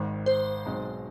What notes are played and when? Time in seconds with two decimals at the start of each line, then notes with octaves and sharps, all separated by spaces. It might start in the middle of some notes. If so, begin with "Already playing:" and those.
Already playing: G#1 G#2 D#3
0.26 C5
0.65 B1 B2 G#3 C4 D#4